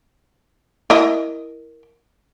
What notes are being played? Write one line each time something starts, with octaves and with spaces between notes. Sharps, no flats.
E4 A#4 D#5